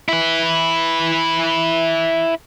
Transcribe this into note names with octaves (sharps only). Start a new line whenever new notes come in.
E4 B4